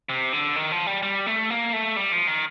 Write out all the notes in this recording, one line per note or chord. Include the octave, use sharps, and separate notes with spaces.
C3
D3
D#3
F3
G3
G3
A3
A#3
A3
G3
F3
D#3